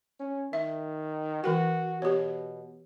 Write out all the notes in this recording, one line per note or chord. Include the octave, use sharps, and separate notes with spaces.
C#4
D#3 E5
E3 F#4 A#4 G5
B2 G4 C#5